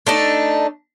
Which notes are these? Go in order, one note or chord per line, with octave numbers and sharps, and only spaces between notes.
A3 D4 D#4